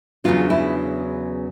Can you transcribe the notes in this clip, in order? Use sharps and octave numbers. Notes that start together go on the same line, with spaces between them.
E2 C#3 F#3 B3 D4 F4
E4